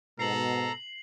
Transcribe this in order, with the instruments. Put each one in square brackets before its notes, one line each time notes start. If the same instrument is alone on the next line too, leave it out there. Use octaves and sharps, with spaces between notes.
[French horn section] G#2 B2 [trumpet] A4 [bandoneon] A#5 [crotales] C7 F#7